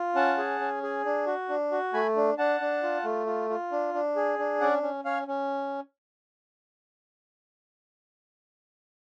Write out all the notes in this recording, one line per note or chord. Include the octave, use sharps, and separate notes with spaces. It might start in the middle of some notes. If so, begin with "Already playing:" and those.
Already playing: F4
C#4 F#5 A5
G#4
C#4
G#4
D4
F#4
D4
F#4
A3 G#5 B5
D4
D4 F#5 A5
D4
F4
A3
F4
F4
D4
D4
G#4
D4
C#4 D5 F#5
C#4
C#4 C#5 F5
C#4